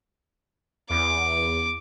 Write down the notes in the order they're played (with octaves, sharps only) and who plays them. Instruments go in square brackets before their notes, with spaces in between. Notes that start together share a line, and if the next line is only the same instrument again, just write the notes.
[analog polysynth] E2 [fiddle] D6